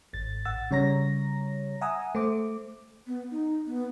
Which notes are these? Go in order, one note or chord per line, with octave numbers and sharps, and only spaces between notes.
G#1 A6
A1 F#5 E6 A6
C#3 G3 C#5 A#5 A#6
E5 F#5 G#5 A#5 D#6 E6
A3 C5 D6
B3
D#4
B3